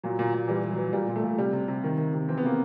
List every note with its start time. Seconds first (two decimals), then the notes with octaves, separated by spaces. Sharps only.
0.04 A#2 F#3
0.19 A#2
0.34 A#2
0.48 E3 G3
0.64 E3
0.71 F#3
0.78 E3
0.93 A#2 G3
1.08 A#2
1.16 A3
1.24 A#2
1.38 C3 G3
1.53 C3
1.68 C3
1.84 D#3
1.98 D#3
2.13 C3
2.29 E3 C4
2.38 B3
2.43 C3 A#3